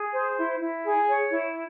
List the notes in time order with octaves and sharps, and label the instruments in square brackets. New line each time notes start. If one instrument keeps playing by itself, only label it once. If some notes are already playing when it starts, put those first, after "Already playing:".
Already playing: [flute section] G#4
C5
E4
E4
G#4
C#5
E4